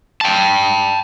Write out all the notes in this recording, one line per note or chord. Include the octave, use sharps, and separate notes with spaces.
G5 A5